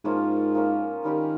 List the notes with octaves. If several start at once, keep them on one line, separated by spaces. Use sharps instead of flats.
G#2 F3 A#3 C#4 F4
F3 A#3 C#4 F4
D#3 G3 C#4 G4 A#4